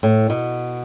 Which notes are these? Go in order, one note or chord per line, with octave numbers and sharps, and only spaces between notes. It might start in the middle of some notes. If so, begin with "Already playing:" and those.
A2
B2